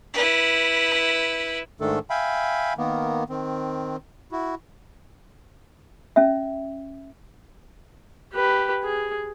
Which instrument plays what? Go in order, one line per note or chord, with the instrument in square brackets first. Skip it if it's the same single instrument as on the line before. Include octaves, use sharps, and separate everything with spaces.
[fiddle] E4 B4
[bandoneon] G#2 D#3 A3 D4 A4
E5 F5 G5 G#5 B5
D#3 A#3 B3
D#3 C4
E4 F#4
[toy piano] C#4 E5
[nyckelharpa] G4 B4
G#4